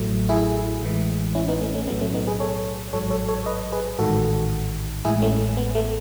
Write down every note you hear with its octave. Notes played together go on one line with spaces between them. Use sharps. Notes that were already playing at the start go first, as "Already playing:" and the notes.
Already playing: A1 A2 F#3 A3
E4 G#4
A1 A2 E3 G#3
C#4 E4
B3 D#4
A3 C#4
A3 C#4
B1 A2 F#3 B3
A3 C#4
B3 D#4
G#4 B4
A4 C#5
A1 G#2 F#3 A4 C#5
A4 C#5
A4 C#5
B4 D#5
G#4 B4
A1 G#2 D#3 F#4 A4
A1 A2 G#3 E4 G#4
A3 C#4
B3
A3